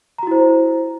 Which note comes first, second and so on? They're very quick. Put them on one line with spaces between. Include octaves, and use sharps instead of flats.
A#5 F#4 E4 C5